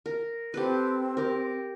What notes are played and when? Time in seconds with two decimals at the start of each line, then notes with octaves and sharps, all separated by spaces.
0.06 A#4
0.54 C4 G4 A4 B4
1.17 G4 A#4